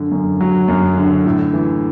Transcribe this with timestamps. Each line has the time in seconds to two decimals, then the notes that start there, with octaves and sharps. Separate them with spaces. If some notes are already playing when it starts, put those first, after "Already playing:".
Already playing: F#2 D3
0.11 F#2
0.41 F#3
0.68 F#2
0.97 D3
1.26 A2
1.53 E3